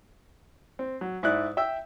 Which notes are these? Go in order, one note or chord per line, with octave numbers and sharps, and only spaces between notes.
C4
F#3
G#2 E4 D5 F#6
E5 G5 E6